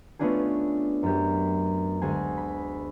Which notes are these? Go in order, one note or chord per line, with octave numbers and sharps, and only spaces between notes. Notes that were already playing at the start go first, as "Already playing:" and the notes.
A3 B3 C#4 D4 F4 G#4
F#2 G4
D2 G#3 G#4 G#5
B5